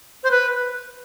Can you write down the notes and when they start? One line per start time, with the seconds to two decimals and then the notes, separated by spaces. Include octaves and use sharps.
0.24 C5
0.31 B4